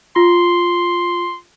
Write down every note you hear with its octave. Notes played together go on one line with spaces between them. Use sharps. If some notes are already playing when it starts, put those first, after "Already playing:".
F4 C6